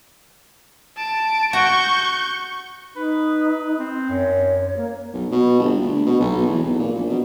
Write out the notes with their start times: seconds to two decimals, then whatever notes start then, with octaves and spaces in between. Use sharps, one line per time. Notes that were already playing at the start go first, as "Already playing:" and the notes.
0.97 A5 D7
1.53 F#4 F#5 C#6 G6
2.96 D#4 B4
3.79 C4
4.09 F#2 C#5
4.77 A#3
5.13 B1
5.31 B2
5.59 G1
5.82 D2
6.06 B2
6.20 B1
6.46 E2
6.63 B1
6.79 A#2
6.95 A#1
7.09 B2